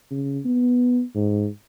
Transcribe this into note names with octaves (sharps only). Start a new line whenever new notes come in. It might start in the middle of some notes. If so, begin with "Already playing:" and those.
C#3
B3
G#2